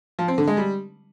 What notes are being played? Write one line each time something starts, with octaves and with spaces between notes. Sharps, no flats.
F3
C4
D3
G#3
G3